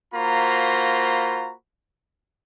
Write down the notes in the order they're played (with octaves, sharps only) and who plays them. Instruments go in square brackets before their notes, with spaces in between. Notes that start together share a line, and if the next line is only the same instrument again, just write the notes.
[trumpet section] A#3 F4 F#4 C5 A#5 B5